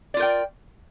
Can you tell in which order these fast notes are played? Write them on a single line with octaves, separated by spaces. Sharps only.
D5 F4 A#4 G5